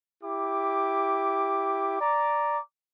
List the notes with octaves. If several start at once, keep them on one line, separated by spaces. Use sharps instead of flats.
E4 G4 D6
D5 A#5 D6